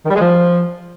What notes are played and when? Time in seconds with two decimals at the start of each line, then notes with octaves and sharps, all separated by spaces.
0.05 D#3
0.10 G3
0.16 G#3
0.21 F3